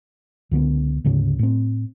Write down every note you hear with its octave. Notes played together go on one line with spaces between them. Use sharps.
C#2 D3 F#3 B3
D2 G#2 C#3 C#4
A2 C4